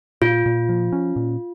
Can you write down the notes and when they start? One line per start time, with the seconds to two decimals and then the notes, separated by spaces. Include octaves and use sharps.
0.22 A#2 F4
0.46 A#2
0.69 F3
0.92 C#4
1.16 A#2